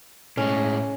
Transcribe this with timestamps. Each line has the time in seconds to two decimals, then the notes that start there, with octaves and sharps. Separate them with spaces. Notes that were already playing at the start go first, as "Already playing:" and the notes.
0.37 A2 G#3 C#4